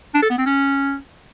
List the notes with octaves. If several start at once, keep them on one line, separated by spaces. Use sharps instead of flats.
D4
A4
B3
C4
C#4